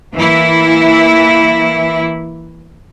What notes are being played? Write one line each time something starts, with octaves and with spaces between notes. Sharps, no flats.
E3 A#3 E4